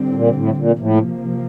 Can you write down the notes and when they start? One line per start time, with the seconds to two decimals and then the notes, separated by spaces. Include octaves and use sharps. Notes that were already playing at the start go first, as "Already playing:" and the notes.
Already playing: D3 G3 C4
0.09 A2
0.14 A#2
0.35 A2
0.57 A#2
0.78 A2 C3 F3 A#3